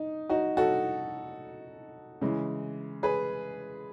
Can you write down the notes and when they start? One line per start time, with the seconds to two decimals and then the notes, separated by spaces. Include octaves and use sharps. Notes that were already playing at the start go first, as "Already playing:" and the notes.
Already playing: D#4
0.30 D#4 F#4
0.57 F#4 A4
2.21 C#3 E3 G#3
3.03 G#4 B4